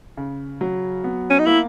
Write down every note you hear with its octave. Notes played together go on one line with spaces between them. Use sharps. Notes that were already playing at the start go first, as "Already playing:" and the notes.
C#3
F#3
B3
C#4
D#4
A#3 E4